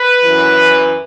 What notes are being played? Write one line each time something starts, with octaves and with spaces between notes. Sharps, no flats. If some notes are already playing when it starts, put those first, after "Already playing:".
Already playing: B4
F#2 E3